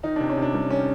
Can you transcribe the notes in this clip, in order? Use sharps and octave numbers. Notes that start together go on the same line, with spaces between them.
D#3 D#4
C3 D4
C#4
C3
D4
G3
D#3 C#4